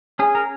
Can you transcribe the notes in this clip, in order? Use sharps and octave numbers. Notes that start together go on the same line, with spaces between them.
C#4 G#4
A#4